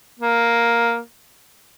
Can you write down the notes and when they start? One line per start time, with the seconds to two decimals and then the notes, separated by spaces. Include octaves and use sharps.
0.20 A#3